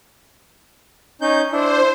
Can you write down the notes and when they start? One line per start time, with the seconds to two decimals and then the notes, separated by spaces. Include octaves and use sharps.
1.22 C#4 D#4 G6
1.52 D4 E4 C5